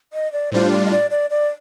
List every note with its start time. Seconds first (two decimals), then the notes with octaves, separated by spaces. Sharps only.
0.13 D#5
0.33 D5
0.52 A2 G3 D4 F4 C5
0.72 D5
0.86 D#5
0.91 D5
1.11 D5
1.30 D5